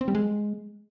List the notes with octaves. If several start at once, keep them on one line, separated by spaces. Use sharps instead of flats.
C4
G3
G#3